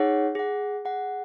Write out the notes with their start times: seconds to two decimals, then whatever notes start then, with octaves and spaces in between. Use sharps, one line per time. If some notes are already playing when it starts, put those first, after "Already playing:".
Already playing: D#4 G#4 C#5 F#5
0.35 G#4 F#5
0.85 G#4 F#5